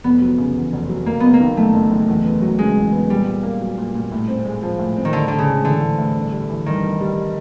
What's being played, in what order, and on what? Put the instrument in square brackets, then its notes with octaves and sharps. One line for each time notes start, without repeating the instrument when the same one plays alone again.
[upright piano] F1 [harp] B3
[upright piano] F#3
C#3
E2
F1
F#3
[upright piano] F#1 [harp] A#3
[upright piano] F#1 [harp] B3
[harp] A#3
[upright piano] D#3
[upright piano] F#2 [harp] A3
[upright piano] F#1
F#1
E2
B3
F#3
[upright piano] C#3 [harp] G#3
[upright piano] E2
B3
[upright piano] A#2 [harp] G3
[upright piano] A#2
A#3
F#3
A#2
A#2
A2
C4
G#3
F3
A2
C4
[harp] D#3
[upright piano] A2 [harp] D3
[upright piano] A2 [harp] D3
[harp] C#3
[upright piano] G#3
[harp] D3 [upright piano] E3
[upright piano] A2
A2
G1
G3
E3
[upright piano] G2 [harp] D#3
[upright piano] G1
G3